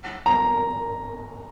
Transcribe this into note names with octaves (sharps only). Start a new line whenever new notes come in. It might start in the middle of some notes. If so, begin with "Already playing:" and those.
A#5